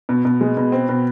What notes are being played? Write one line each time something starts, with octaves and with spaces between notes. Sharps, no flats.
B2
B2
G#3
B2
C4
B2